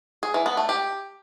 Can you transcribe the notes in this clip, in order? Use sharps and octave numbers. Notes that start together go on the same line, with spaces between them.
G#4
E3
B3
A3
G4